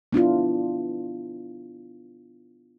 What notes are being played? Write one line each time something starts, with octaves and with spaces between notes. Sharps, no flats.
B3 D4 E4 F4